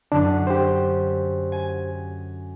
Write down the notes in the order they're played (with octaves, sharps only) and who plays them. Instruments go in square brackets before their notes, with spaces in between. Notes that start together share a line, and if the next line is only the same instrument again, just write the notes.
[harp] F#2 D3 [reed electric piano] D4
[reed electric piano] G4 C5
[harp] G#5